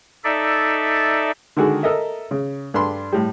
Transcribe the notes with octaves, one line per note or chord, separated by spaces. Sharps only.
D#4 A4 D5 E5
D3 D#3 G#3 F#4 G#4 A4
A4 A#4 D#5 E5
C#3
G2 D4 A4 B5 C6
A2 G3